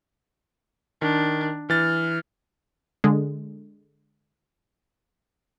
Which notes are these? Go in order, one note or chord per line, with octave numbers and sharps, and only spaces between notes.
D#3 D4
E3 F6 A6
D3 G#3